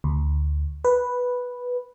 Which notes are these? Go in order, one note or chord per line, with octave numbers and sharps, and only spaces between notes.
D2
B4